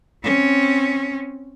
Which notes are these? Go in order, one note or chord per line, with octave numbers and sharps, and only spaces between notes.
C4 C#4